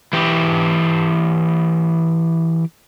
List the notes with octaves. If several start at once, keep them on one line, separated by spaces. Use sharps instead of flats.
E3 G4